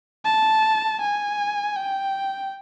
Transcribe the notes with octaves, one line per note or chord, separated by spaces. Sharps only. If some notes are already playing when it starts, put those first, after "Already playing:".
A5
G#5
G5